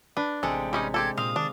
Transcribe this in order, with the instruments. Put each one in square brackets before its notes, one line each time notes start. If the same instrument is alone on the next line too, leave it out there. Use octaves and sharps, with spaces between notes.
[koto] D4 [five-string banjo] B4
[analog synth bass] A1 [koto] C3 G#3 [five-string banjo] A4 [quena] G5
[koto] C3 [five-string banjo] G3 C#4 D#4
[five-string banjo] C4 G4 A4 [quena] G#6
[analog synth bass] A#2 [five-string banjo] C4 [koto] F5 [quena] D#6
[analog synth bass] D#3 [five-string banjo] D4